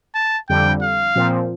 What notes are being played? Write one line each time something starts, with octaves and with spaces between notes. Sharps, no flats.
A5
F2 D3 G3 G5
F5
A#2 F3 C4